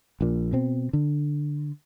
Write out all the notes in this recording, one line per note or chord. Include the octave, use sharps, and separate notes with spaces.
A#1 A#2
B2 C4
D3